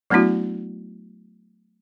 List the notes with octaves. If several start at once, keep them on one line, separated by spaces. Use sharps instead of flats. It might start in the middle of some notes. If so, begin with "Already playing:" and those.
F#3 A3 B3 D4 E4 F#4